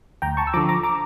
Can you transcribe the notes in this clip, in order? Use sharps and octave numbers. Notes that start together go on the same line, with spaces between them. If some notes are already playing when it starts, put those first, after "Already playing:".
D2 G5 A#5
A5 C#6
E6
D3 F3 A#5 D6
A#5 D6
A#5 D6